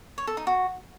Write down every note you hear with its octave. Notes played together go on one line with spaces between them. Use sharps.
C#5
A4
D#4
F#4